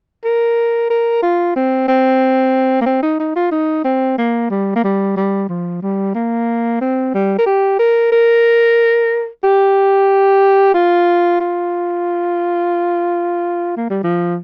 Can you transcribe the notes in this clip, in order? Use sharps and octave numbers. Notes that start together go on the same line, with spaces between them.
A#4
A#4
F4
C4
C4
A#3
C4
D#4
D#4
F4
D#4
C4
A#3
G3
A#3
G3
G3
F3
G3
A#3
C4
G3
A#4
G4
A#4
A#4
G4
F4
F4
A#3
G3
F3